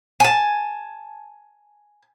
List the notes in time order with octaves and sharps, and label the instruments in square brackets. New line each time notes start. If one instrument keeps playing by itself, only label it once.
[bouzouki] G#5 A5